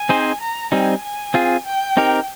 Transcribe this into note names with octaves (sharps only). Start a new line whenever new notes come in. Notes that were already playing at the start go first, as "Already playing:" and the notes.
Already playing: G#5
C4 D#4 G#4 C5
A#5
G3 C4 D#4 G#5
G#5
C4 F4 G#4
G5
C4 D#4 G4 A#4